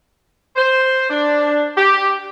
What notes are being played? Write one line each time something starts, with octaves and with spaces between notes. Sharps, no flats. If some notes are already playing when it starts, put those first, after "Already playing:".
C5
D4
G4